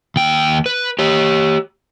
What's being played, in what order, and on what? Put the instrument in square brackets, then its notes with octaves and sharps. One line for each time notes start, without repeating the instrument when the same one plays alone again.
[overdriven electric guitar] D#2 G5
B4
G4 C#5